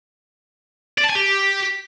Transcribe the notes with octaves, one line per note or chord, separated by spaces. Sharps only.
D5
A5
G#5
G4